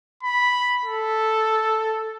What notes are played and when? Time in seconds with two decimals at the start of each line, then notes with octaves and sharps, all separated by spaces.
0.23 B5
0.85 A4